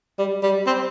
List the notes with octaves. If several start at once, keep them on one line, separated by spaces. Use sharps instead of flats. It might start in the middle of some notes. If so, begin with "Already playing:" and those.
G3
G3
C4